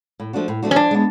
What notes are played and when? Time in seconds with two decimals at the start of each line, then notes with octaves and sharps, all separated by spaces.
0.20 A2
0.33 F3 A3 D4 F#4
0.48 A2
0.62 F3 A3 D4 F#4
0.71 C#4
0.76 F3 D4
0.91 G#3 B3